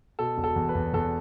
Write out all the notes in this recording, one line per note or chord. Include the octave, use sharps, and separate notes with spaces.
B2 A4
E1
A4
E2
B4
E2
E2 A4